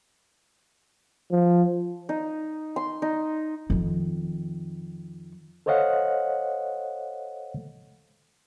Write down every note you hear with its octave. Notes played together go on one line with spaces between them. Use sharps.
F3
D#4
C6
D#4
F2 D#3
A4 C5 C#5 D#5 F5 F#5